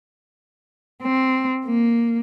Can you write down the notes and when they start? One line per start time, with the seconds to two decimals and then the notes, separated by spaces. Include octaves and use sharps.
1.03 C4
1.66 A#3